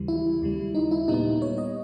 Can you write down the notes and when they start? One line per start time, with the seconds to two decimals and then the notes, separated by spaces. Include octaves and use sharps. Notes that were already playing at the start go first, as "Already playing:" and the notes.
Already playing: D#2 C#3 E3 G3
0.08 E4
0.42 D#2 C#3 G3
0.75 D#4
0.91 E4
1.08 A#2 G3 B3 D#4
1.42 C#5
1.58 D#5